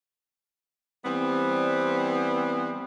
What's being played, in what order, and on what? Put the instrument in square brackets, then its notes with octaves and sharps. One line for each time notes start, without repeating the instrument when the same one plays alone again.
[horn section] E3 G3 B3 C4